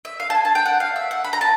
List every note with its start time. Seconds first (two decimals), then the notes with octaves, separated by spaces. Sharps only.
0.05 E5
0.20 F5
0.30 A5
0.35 G#5
0.45 A5
0.55 G5
0.65 F#5
0.80 F5
0.96 E5
1.11 F#5
1.24 B5
1.33 A#5
1.41 A5